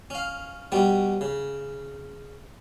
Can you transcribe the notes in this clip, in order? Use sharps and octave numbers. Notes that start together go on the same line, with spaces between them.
C#4 F5
B2 G3 C#4
C#3